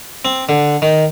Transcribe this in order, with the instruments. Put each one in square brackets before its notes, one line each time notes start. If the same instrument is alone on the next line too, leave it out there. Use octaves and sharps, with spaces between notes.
[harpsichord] C4
D3
D#3